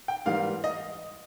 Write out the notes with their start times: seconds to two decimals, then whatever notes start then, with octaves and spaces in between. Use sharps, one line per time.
0.08 G5
0.26 G#2 E3 G3 A#3 F5
0.64 D#5